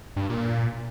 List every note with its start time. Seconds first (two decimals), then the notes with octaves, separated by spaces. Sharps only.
0.16 G2
0.30 A#2